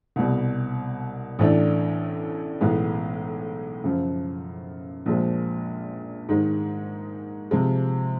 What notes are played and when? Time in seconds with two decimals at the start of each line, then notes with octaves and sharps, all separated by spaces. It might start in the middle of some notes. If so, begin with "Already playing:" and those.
0.16 C2 B2 G3
1.39 A1 A2 E3 A3 D4
2.61 B1 A2 E3 G#3 B3
3.84 F#2 C#3 F3
5.06 A#1 A#2 F3 G#3
6.29 G#2 D#3 G#3
7.51 C3 F3 G#3